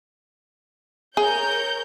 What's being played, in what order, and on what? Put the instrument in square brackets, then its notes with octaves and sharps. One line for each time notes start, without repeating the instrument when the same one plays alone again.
[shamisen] G#4 [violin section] A#4 C#5 G6